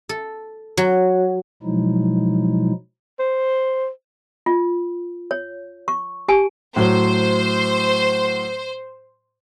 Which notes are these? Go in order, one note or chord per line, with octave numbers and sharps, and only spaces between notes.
A4
F#3
B2 F3 F#3 G#3 D#4 E4
C5
F4
C#5
C#6
G4 G#5 A5
A2 F#3 C5